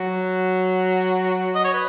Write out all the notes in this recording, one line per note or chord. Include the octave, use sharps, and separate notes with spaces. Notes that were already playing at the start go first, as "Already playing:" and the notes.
Already playing: F#3 F#4
D#5
C#5
B4